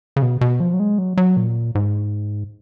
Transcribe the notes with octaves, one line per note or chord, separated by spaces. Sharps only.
C#3
B2
B2
F3
F#3
G#3
F#3
F#3
A#2
G#2